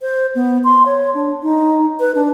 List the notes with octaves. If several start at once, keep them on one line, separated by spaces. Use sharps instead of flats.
C5
B3
C6
C#5
D4
D#4
B4
D4